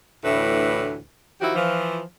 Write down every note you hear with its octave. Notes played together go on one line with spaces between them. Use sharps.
D2 A2 E3 D4 B4
D#3 F3 E4 F#4 G4
E3 F3